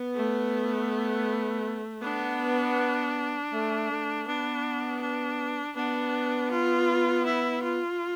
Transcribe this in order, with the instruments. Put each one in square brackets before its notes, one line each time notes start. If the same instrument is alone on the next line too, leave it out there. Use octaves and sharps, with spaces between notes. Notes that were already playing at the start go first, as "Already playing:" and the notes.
Already playing: [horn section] B3
[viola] A3
[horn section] B3 [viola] D4
[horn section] A3
A3
[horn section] B3 [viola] D4
[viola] D4
[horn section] B3 [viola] D4
[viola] F4
E4
F4